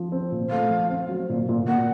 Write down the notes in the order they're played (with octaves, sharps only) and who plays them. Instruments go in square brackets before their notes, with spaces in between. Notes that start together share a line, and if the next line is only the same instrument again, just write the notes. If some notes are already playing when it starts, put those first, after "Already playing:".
Already playing: [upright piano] F3
C4
A#2
[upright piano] A3 [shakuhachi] F5
[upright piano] F3
C4
F#3
A#2
A#2
[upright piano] A#3 [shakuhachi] F#5